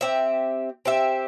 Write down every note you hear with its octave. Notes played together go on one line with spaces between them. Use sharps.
C4 G4 E5
C4 G4 E5